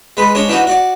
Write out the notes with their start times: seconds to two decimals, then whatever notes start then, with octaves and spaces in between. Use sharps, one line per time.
0.17 G#3 B4
0.35 G#3 D4 C#5
0.48 E3 D4 D#4 F#4
0.67 F#4 D5